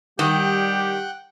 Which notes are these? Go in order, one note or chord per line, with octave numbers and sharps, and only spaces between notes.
D#3 G3 G4 F#5 G5